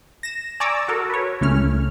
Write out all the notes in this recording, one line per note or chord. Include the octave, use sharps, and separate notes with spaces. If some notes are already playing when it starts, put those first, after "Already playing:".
A#6 E7
D5 G#5 A#5 C#6 D6 E6
F#4 A4 A#4
B4 C#5
C#2 A3 C#4 F6